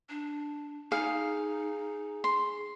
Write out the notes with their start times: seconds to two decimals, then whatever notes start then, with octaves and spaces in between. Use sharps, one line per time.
0.09 D4
0.92 D#4 G#4 F5
2.24 C6